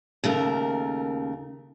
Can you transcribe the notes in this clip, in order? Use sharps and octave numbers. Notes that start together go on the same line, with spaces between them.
D#2 C#3 A3 A#4